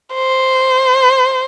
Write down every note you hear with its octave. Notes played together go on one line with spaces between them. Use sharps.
C5